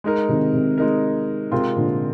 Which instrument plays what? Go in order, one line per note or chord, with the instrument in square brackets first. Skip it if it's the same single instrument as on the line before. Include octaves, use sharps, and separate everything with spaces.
[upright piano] G#3 D#4 A#4
[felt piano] C3 D#3
C3
[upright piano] G#3 D#4 A#4
[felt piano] C3 [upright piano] G#3 C4 F4 A#4
[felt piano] A#2 D3